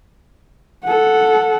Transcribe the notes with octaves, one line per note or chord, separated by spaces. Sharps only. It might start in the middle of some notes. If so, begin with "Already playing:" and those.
A4 F#5